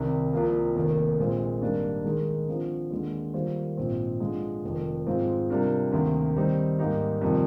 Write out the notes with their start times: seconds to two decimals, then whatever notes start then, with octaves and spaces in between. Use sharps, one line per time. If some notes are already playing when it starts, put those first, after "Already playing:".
Already playing: C2 C3 D#3
0.33 C2 C3 F3 A#3
0.76 F1 D#2 D#3
1.19 A#1 A#2 G#3 C4
1.62 G#1 G#2 G3 A#3 D4
2.05 D#3 G#3 D#4 G#4
2.49 D3 F3 C4
2.91 D#2 D3 G#3
3.34 D#3 G3 A#3 F4 C5
3.77 A#1 G#2 F3 C4
4.20 D3 F3 G#3
4.64 F1 F2 D#3
5.07 G#2 F3 G#3 C4 F4
5.50 C3 G3 D4 F4 A#4
5.92 D2 C3 D#3 A#3
6.36 D#3 G3 C4 D#4
6.79 G#2 G3 A#3 D#4 G4
7.21 F2 C3 D#3 G3